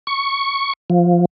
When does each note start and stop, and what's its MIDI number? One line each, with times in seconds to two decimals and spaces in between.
0.07 0.73 85
0.90 1.25 53